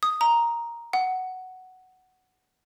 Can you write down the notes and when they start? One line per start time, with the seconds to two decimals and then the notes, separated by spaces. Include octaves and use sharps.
0.03 D#6
0.21 A#5
0.93 F#5